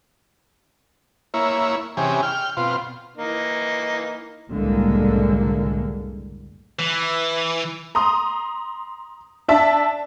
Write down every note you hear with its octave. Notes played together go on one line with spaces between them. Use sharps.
A#3 E4 C#5
C3 E3 C#4 G4 G#4
G5 F6
B2 C4 F4
E3 A#3 D#4
F#1 C2 A2 D3 G#3 A#3
E3
A#5 C6 D#6
D4 E5 A5